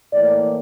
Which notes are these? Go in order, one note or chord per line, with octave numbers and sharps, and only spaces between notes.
A2 E3 A#3 D5